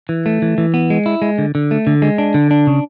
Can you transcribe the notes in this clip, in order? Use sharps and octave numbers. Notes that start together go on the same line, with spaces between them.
E3
A3
E3
E3
B3
G#3
E4
G#3
D3
D3
A3
D3
G#3
D4
D3
D4
C#3